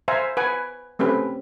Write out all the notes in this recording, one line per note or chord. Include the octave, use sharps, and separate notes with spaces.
C5 E5 F5 G#5 A#5
B4 F#5 G#5
A3 C4 C#4 G4 B4